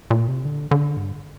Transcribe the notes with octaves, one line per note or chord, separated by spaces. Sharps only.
A#2
C3
D3
D3
G2